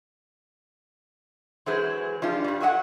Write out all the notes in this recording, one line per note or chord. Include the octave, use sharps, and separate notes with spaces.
E3 F#3 G#3 G#4 B4 C5
F3 G3 D4 D#4 F4
G2 G3
F#3 F#4 D#5 E5 F#5